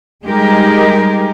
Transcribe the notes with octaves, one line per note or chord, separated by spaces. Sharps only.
G3 G#3 D#4 G4 G#4 A#4